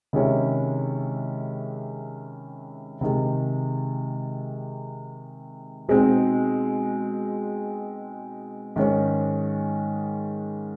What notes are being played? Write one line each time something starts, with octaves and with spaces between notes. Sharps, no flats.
C3 D#3 G#3 C#4 E4
C3 D#3 G#3
B2 G#3 C4 D#4
G#2 D#3 G#3 C#4